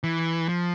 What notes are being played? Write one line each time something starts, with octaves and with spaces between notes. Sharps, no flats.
E3
F3